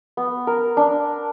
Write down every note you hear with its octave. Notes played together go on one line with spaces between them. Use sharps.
B3
A#4
D4